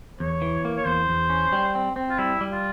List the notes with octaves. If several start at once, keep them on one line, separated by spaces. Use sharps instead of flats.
E2 C#5
E3
A#3
C#5
E2 C5
E2
C#4
G3
C4
C4
F4
G3 E4
G3
F4